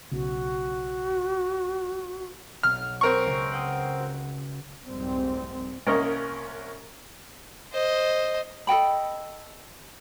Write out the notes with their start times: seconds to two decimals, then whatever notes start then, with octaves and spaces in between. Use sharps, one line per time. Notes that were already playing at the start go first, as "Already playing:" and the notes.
0.12 B1 C#3 F#4
2.63 B1 F6
3.01 C4 A#4 C#6
3.27 C#2
3.52 F#5 G5 D#6
4.00 F#4
4.86 F1 C2 G#2 G3 C4
5.87 C2 A#3 C#4 A#4 D#5 C#6
7.72 C5 D#5
8.67 A4 D#5 G5 B5